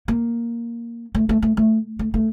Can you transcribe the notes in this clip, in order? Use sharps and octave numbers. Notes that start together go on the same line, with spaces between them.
A#3
A3
A3
A3
A3
A3
A3